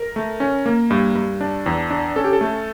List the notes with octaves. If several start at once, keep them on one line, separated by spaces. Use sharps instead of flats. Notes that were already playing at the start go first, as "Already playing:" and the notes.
Already playing: A#4
A3
C#4
A#3
G2
G2
D4
E2
D4
C#4 A4
G4
A4
A3